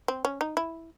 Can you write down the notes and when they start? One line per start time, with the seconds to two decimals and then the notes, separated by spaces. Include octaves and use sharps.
0.08 C4
0.25 C#4
0.41 D#4
0.57 E4